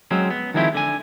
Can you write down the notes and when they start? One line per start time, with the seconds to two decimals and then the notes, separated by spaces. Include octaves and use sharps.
0.11 F#3 G#3 C4 C#4
0.30 B3
0.54 D#3 F3 G#3 C4 E4 G4
0.75 D3 G#5